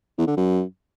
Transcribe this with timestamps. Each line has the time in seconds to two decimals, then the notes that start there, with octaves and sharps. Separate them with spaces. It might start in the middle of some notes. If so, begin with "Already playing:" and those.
0.18 E2
0.27 D3
0.37 F#2